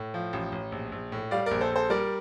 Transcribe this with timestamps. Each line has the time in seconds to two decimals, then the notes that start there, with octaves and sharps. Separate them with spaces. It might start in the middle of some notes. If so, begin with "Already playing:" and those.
Already playing: A2
0.14 F3
0.33 A1
0.52 A1
0.72 A#1
0.92 A#1
1.12 A2
1.31 G3 D5 F5
1.46 A#1 A#4 D5
1.61 A4 C5
1.72 A#1 A4 C5
1.90 G3 A#4 D5